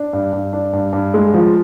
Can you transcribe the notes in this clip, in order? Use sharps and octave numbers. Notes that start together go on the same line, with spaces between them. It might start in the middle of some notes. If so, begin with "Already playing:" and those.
Already playing: D4
G2
G2
D4
G2
G2
G#3
F3